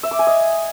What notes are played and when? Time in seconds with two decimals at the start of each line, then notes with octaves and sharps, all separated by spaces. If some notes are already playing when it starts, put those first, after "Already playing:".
0.03 E5
0.11 D6
0.19 G#5
0.27 D#5